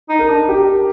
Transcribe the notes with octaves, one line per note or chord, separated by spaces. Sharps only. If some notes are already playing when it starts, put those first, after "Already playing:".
D#4
A#4
D4
G4